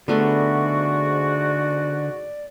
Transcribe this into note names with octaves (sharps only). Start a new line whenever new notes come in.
G#2 D3 A3 B3 F#4 D5